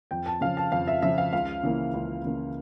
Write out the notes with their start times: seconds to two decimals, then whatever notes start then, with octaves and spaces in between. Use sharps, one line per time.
0.11 F2 G5
0.26 A5
0.41 C#3 F3 F5
0.57 A5
0.72 F2 F5
0.87 E5
1.02 C#3 F3 E5
1.18 F5
1.33 C#2 F5
1.63 C#3 E3 A#3
1.94 C#2
2.25 C#3 E3 A#3